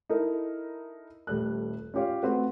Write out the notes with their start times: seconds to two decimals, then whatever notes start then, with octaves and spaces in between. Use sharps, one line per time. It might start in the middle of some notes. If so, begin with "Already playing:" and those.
0.09 D#4 E4 A4 A#4
1.27 D#1 G3 A3 F#6
1.94 C#4 F4 G4 C#5 F5
2.23 A3 C4 F#4 B4